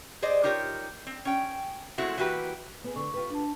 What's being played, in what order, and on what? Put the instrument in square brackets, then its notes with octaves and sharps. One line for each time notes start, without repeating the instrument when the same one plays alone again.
[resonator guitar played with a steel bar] G#4 C5 D5 D#5
D#4 F4 G4 A#4 C#5
C4
C#4 G5
G#3 A3 C4 E4 F#4
E3 A#3 F#4 G4 B4
[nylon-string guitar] B3 G#4
[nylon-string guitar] D3 [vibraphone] C#6
[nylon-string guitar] F4 G4 B4
[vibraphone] D4 A5